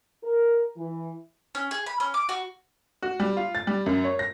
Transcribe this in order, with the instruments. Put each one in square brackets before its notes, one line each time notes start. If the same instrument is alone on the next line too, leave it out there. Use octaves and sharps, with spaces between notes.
[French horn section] A#4
E3
[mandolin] C#4
G#4
B5
C#4
D6
F#4
[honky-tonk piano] F#4
G3
F4
A6
G3
F#2
C#5
A#6